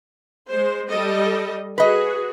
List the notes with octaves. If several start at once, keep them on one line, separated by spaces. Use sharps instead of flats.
G#3 C5
G3 A4 D#5
F#4 G#4 B4 D#5